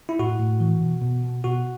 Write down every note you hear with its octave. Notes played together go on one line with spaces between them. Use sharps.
E4
A2 F#4
A2
E3
B2
B2
B2
B2 F#4